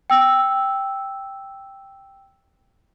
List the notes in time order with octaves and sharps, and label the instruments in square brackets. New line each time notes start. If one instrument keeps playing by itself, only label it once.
[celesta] G5 E6